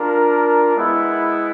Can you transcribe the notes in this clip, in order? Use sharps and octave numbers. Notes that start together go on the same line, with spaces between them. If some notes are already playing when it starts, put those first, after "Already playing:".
Already playing: D4 F4 A#4
G#3 B3 E4